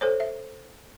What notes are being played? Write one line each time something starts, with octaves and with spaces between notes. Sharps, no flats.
A4 C5 C#5
E5